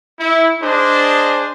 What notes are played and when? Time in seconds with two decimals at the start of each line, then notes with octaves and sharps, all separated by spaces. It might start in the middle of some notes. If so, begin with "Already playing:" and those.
0.20 E4
0.61 D4 G#4 C5 D#5